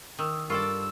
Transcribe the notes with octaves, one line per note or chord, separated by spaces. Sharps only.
D#3 D#6 E6
G2 F4 A4 A#4 D5 C6 C#6 E6